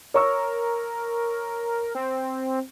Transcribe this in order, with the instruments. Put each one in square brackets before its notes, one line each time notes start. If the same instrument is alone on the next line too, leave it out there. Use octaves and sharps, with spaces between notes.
[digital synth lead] A#4 [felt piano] C#5 C#6 E6
[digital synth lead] C4